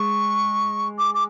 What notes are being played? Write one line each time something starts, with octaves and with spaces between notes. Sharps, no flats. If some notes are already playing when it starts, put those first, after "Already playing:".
Already playing: G#3 C#6
D6
D6